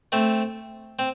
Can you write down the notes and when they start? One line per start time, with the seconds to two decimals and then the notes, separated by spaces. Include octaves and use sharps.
0.12 A3 C4
0.99 C4